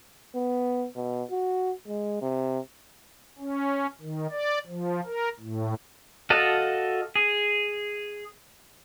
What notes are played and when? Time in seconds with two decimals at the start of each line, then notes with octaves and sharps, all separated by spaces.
0.35 B3
0.96 B2
1.31 F#4
1.88 G#3
2.22 C3
3.38 C#4
4.01 D#3
4.31 D5
4.67 F3
5.05 A#4
5.40 A2
6.30 F#4 A4 D#5 F5 A5
7.16 G#4